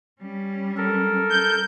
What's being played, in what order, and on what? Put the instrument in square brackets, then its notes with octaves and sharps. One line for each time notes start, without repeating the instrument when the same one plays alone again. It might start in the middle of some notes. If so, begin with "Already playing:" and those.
[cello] G3 C#4
[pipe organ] A4 A#4
[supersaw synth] G6